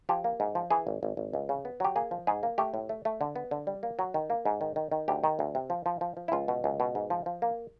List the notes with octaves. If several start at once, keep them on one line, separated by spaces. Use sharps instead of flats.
F3 G4
A#3
G#2
F3
E3 G#4
G#1
G#1
G#1
C#2
C#3
B3
F#3 G4
A#3 G#4
F3
G#2 G#4
A#3
A3 G4
A2
A3
A3
D3
B3
D3
G3
A#3
F#3
D#3
A#3
G#2
D#3
D#3
D#3
D2 G4
D#3
D2
C3
F3
F3
F3
F3
E4
C#2 F4
B2
C#2
B2
G#2
F3
F3
A#3